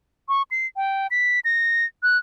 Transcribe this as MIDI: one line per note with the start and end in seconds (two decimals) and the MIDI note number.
0.29 0.42 85
0.51 0.67 96
0.76 1.07 79
1.11 1.40 95
1.45 1.85 94
2.03 2.18 90